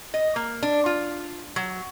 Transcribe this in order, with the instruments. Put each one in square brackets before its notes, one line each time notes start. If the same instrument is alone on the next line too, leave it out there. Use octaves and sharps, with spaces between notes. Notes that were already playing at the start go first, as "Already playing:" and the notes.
[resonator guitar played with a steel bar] D#5
A#3
D4
F4
F#3